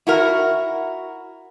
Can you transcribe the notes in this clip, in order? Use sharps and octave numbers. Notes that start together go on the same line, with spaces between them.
E4 F#4 A#4